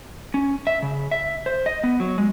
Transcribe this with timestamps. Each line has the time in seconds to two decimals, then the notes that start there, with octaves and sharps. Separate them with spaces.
0.34 C#4
0.67 E5
0.82 C#3
1.11 E5
1.46 C5
1.66 D#5
1.84 B3
2.00 F#3
2.18 G#3